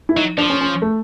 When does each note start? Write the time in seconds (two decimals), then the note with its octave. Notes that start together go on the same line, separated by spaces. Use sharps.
0.09 E4
0.16 F#3 D#4
0.38 F3 D4
0.50 C#4
0.61 C#4
0.82 A3